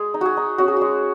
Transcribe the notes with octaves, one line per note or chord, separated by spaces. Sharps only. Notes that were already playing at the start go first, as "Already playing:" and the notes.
Already playing: G#3 G#4
D#4
F#4 G#4
D#4
C#4 F#4
G#4
G#3 F#4